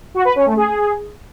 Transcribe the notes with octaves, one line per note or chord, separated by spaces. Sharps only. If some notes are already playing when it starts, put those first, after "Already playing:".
F#4
B4
C#4
A3
G#4